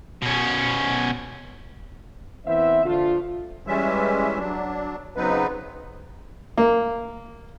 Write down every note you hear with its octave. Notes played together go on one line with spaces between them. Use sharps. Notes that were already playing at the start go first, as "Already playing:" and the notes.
B2 C#4
E3 B3 C4 E5
D3 F3 A3 F4
E3 G3 G#3 C#4 E5
F#3 D4
C#3 F#3 B3 C4 D#4 B4
A#3